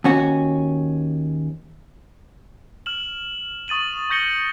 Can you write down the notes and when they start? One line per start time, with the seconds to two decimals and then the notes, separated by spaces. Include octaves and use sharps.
0.04 D#2 C#4 F#4
2.86 F6 E7 F#7
3.68 C#6 D#6 A6 D#7 F#7
4.10 C#6 G6 A#6 C#7 G7